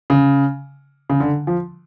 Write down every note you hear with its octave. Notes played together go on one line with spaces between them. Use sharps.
C#3
C#3
D3
F3